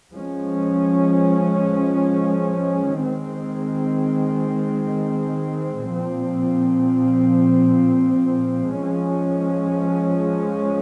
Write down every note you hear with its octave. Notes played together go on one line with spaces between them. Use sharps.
F3 G#3 C#4
D#3 G#3 C4
A#2 F3 C4
F3 G#3 C#4